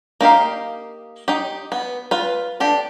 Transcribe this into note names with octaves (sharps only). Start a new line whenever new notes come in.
A#3 D#4 G4 F5
D#4 G4
B3
F4 B4
D4 G4 A4